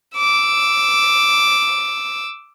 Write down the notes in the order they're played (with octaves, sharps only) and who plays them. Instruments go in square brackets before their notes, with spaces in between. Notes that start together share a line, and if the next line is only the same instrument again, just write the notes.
[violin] D6 E6